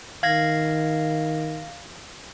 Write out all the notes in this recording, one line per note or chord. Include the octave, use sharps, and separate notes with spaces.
D#3 F5 G#6 A#6